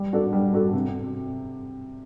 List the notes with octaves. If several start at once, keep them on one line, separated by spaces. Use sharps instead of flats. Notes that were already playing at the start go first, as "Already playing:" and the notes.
Already playing: G3
D4 F#4 A4
G3
D4 F#4 A4
C3